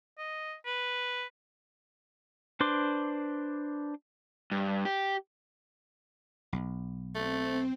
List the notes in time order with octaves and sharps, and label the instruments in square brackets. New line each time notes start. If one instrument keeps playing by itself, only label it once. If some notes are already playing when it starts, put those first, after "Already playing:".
[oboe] D#5
B4
[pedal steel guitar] D4 B4 C5 C6 D6
[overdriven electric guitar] G2
G4
[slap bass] B1
[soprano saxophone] A3 [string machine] C4